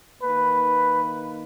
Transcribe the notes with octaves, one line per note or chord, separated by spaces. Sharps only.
D#3 A#3 B4